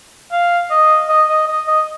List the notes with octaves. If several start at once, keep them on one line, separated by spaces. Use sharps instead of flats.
F5
D#5
D#5
D#5
D#5
D#5